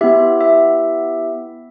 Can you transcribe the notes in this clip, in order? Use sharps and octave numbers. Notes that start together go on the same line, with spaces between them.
B3 E4 G4 E5
E5